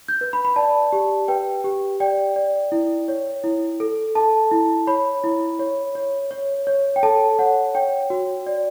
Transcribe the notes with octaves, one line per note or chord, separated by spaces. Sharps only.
G6
B4
B5
B5
D5 A5
G4
B4 G5
G4
D5 G5
D5
E4
C#5
E4
A4
A4 A5
E4
C#5 B5
E4
C#5
C#5
C#5
C#5
G5
A4 A5
C#5 F#5
C#5 G5
F#4
D5